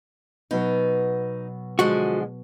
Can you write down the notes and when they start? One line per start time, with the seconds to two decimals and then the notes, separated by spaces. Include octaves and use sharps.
0.51 B2 F#3 B3 D#4
1.79 D3 F3 G#3 F#4